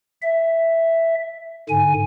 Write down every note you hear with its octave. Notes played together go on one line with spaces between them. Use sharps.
E5
G#2 D3 G#5